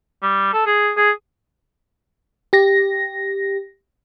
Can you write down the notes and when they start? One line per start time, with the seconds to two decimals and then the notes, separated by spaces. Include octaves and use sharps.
0.22 G3
0.53 A4
0.66 G#4
0.97 G#4
2.53 G4 A#6